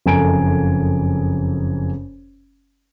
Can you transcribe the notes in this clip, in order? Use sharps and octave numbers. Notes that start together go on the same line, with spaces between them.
F#1 F2 A4 G#5 A#5 D7